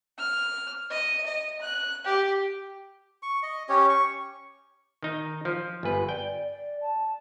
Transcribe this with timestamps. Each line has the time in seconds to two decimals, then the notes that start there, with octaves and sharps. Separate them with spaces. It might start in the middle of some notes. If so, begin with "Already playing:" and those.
0.19 F6
0.91 D#5
1.26 D#5
1.61 F#6
2.05 G4
3.23 C#6
3.43 D#5
3.69 C#4 G4 C#5
3.89 C#6
5.03 D#3 D#4
5.45 F3
5.83 G1 B4 G#5
6.09 D5 G5
6.43 D5
6.81 A5